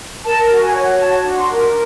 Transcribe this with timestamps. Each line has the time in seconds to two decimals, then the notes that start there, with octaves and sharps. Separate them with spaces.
0.24 A#4 A5
0.49 F#4
0.61 G#5
0.74 C#5
0.98 F#4 A5
1.23 D4
1.35 C6
1.49 A#4